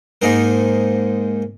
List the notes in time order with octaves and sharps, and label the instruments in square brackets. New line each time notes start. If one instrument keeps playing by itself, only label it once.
[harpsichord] G#2 A#3 D#4 A#4